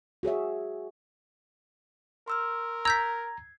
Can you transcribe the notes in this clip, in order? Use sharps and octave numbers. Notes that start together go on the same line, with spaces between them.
F#4 G#4 C#5 E5
A#4 C6 E6 F6
A#5 E6 G6 G#6 B6